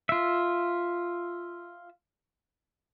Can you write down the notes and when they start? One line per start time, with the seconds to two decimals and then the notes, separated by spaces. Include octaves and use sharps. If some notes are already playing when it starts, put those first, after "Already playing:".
0.09 F4 E5